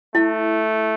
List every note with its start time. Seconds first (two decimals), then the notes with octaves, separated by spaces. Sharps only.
0.15 A3 E4